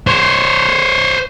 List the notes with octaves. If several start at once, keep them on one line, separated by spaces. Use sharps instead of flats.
C5 C#5